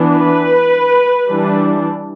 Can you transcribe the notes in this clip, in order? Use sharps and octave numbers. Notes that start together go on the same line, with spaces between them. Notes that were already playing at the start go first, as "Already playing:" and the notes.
Already playing: E3 B3 D4
B4
E3 G3 D4